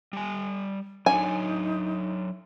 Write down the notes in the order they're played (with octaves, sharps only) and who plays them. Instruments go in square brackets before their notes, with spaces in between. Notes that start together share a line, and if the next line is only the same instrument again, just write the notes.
[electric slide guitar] G3 G#5
[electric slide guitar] F#3 D4 C#5 [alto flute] D#4 [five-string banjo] G#5